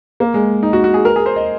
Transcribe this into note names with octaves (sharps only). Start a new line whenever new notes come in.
A#3
G#3
D#4
F#4
F#4
G#4
A#4
G#4
C5
D#5